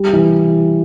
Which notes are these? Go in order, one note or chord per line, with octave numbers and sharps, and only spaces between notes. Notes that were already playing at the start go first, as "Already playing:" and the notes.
Already playing: G3
E3